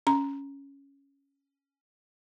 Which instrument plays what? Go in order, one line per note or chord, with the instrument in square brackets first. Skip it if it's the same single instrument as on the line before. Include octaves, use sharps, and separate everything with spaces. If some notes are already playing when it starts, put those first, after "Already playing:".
[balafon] C#4 A#5